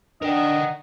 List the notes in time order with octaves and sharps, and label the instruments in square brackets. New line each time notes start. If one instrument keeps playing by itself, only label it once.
[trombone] D4 [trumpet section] D#4 D#5 F#5 [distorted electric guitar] A#4 G5